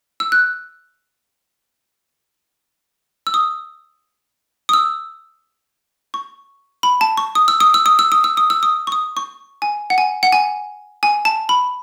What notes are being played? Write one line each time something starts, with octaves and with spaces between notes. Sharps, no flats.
E6
F#6
E6
D#6
D#6
E6
C#6
B5
A5
C#6
D#6
E6
D#6
E6
D#6
E6
D#6
E6
D#6
E6
D#6
C#6
D#6
C#6
G#5
F#5
G#5
F#5
G#5
G#5
A5
B5